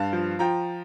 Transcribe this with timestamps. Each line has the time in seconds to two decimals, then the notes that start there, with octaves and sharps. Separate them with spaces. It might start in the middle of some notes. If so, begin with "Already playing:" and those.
Already playing: G2 F5 A5
0.13 F3
0.39 F3 G5 A#5